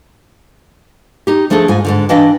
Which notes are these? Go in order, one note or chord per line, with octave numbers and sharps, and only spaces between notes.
D#4 G4
F3 A3 D4 G#4 A4
G#2 F4 G#5
G#2 B2 D3
E3 D4 D#5 F5 G5